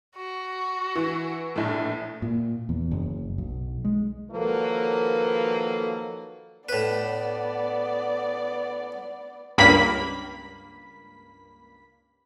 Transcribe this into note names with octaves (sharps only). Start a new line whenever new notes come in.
F#4
E3
A#1 A2
A#2
E2
F#1
B1
G#3
D#3 F3 F#3 A#3 A4 B4
A2 B3 B4 D5
C#2 G2 A#3 B5 B6